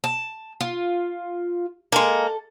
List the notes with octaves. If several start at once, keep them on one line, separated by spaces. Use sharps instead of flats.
A5
F4
G#3 A#3 A4